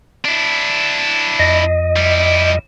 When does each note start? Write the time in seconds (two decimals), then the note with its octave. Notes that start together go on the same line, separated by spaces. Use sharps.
0.25 D4 E4
1.39 F2 D#5
1.96 G3 E4